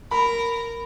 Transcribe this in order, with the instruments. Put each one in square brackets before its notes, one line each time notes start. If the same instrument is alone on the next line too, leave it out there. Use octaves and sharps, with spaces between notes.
[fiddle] A#4 [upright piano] B5